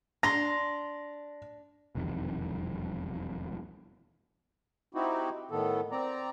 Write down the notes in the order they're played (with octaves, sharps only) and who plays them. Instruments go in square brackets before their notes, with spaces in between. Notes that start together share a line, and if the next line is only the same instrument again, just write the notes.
[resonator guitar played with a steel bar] D4 [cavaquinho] A#5 C6 [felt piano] A#6
[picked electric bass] E1 C2 F2 D#3
[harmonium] C4 D#4 E4 F#4 G4
A2 D#3 B3 A4
C4 D5 A#5